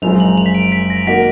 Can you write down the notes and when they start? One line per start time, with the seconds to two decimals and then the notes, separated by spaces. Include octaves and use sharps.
0.02 F#1 F#2 F3 G#3 F7
0.20 F#7
0.38 F7
0.46 B6
0.55 D7
0.72 B6
0.90 A#6
1.07 D#3 A#3 D#4 F#4 B6